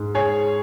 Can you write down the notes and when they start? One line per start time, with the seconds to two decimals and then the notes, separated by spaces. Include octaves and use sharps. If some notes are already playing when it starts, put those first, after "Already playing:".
Already playing: G#2 G#3
0.15 G#4 C#5